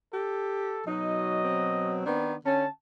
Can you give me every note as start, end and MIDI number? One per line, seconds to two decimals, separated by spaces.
0.13 0.81 67
0.13 0.85 69
0.87 2.04 47
0.87 2.04 54
0.87 1.44 63
0.87 2.00 75
1.45 2.36 60
2.06 2.34 51
2.06 2.34 59
2.06 2.34 62
2.46 2.66 50
2.46 2.66 61
2.46 2.70 81